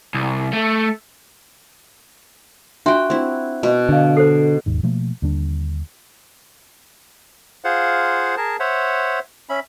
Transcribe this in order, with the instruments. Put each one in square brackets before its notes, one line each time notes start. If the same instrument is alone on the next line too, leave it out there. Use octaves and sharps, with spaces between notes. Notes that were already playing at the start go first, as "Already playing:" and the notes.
[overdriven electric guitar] C2
A3
[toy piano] D4 F4 C6 [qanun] F#4 G5 [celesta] E5 F#5 F#6
[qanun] C4 E4
B2
[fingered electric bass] D3 [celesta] D#5 F5
[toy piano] A4 C5 [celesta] C7
[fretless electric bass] E1 D#2 G#2
B2 F3 A3 A#3
D#2 D3 G3 D4
[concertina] F4 G#4 C5 F5 F#5
G#4 A#4 A5
C5 C#5 E5 F#5
C#4 E5 B5